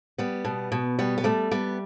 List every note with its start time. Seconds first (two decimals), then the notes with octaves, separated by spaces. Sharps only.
0.18 G3 B3
0.45 B2
0.72 B2
0.99 G3 B3
1.18 B3
1.24 G3 A3
1.51 G3 B3